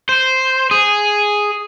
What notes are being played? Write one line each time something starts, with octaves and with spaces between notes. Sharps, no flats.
C5
G#4